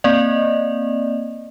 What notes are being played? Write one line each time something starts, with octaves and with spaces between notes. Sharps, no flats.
A#3 C4 D5 D#5